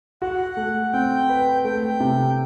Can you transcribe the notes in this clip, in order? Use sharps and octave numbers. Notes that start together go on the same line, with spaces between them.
F#4 F#5
A3
C4 G5
B4
A3 G5
C3